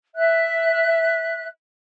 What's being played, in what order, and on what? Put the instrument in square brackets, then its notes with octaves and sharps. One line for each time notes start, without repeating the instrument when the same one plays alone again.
[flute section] E5 F#6